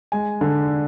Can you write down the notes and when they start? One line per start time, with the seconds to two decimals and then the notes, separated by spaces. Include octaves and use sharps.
0.12 G#3 G#5
0.41 D3